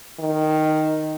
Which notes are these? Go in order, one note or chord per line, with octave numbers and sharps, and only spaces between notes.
D#3